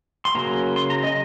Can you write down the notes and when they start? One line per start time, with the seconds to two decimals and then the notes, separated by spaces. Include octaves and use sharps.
0.25 C6
0.35 C#3 F#3 A#3 C#4 A#5
0.76 C6
0.90 A#5
1.04 D#5